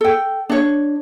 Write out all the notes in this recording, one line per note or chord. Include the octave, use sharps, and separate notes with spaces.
A4 G5
D4 C#5